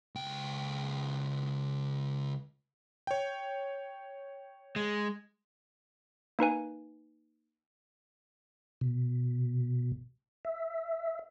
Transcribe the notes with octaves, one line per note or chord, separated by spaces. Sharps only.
C#2 G5
C#5 G5
G#3
A#3 D#4 B4 G#5
B2
E5